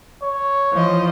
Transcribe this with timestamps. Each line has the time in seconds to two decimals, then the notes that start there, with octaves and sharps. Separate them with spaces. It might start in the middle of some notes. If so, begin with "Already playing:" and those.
0.23 C#5
0.73 E3 F3 D#5